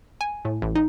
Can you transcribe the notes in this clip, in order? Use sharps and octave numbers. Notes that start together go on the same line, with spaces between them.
G#5
A2
A1
D#4